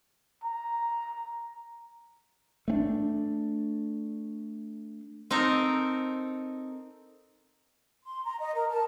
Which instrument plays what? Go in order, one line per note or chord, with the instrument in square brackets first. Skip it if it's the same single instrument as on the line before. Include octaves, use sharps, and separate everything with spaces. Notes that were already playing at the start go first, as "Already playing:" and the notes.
[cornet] A#5
[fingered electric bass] A3 C4 D4
[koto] C4 D#4 A4 A#4
[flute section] C6
A#5
D#5
A#4
A5